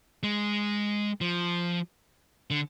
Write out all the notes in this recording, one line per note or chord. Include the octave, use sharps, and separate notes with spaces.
G#3
F3
D3